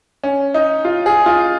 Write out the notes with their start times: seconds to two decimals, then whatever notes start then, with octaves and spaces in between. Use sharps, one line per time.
0.23 C#4
0.54 D#4
0.85 F4
1.06 G#4
1.26 F4